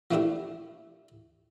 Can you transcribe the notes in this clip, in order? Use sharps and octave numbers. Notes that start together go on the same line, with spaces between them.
F3 A3 A#3 D4 E4 G4